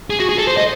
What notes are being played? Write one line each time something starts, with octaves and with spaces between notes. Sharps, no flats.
G#4
F#4
G#4
A4
C5
D#5